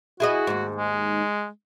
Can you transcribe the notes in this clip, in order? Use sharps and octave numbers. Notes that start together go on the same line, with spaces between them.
E4 F#4 G#4 D#5
D#2 G#2
G#3